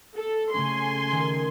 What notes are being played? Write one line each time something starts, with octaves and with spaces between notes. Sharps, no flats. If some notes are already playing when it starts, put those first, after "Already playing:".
A4
C#3 A3 C#4 G#5 C6
D#3